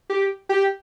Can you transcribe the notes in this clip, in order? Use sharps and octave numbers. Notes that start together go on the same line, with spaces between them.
G4
G4